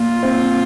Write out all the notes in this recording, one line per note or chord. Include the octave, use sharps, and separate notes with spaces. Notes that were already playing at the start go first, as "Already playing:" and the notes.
Already playing: A#2 F4
C4